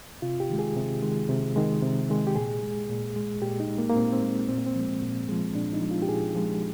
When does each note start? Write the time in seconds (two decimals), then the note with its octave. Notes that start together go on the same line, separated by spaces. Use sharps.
0.22 C3 F4
0.40 G4
0.50 D#3 G#3
0.59 G#4
0.76 C3
1.03 D#3 G#3
1.29 C3
1.56 D#3 G#3
1.82 C3
2.09 D#3 G#3
2.27 G4
2.36 A#2 G#4
2.63 G#3
2.90 A#2
3.16 G#3
3.42 A#2 G4
3.60 D#4
3.68 G#3
3.78 A#3
3.89 A#3
3.96 A#2 C4
4.13 C4
4.23 G#3
4.49 A#2 C4
4.58 A#3
4.66 C4
4.75 F3 G#3
5.02 A#2
5.29 F3 G#3
5.55 A#2 D4
5.73 D#4
5.81 F3 G#3
5.91 F4
6.02 G4
6.09 A#2 G#4
6.35 F3 G#3